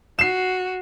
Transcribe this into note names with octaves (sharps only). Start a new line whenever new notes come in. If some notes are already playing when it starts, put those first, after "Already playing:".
F#4 C7 E7